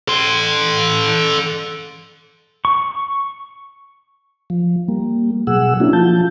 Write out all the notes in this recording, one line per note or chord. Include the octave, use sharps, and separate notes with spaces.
A4 C6
C#6
F3
G3 A#3
B2 F#3 G#4 F#5 E6
A#3 C#4 D4 E4 F#4
F3 F4 A5 G6